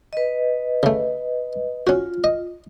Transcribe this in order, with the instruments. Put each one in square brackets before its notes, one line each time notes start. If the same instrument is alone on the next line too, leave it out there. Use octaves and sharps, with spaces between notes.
[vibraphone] B4 D#5
[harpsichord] C#3 A3
[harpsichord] C#4 F#4 [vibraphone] F4
[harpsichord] D#5